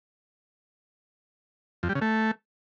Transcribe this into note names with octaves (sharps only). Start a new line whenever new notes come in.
F2
G3
C#3
A3